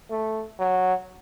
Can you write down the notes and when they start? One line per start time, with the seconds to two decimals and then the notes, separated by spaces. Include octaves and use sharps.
0.10 A3
0.59 F#3